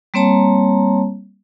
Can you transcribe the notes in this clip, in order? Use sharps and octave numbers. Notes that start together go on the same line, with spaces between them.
G3 A#3 C4 C#5 A5 A#5